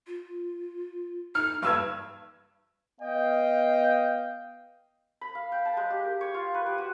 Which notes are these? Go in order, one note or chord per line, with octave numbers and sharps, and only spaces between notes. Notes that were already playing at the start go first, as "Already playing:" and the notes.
F4
D#4 F6
G2 B4 E6 G#6
B3 D#5 F5 G5
B5
F5
G5
A5
G#3
G4
A#4
C#5
F4
B4
G4
F#4